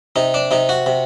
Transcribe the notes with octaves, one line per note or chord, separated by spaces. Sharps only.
C3 D#4
D4
C3 D#4
F#4
C3